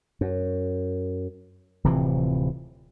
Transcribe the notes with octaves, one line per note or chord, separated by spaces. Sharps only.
F#2
D1 C3 E3 F3